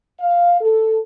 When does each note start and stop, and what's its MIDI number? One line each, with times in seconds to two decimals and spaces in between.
0.20 0.60 77
0.61 0.98 69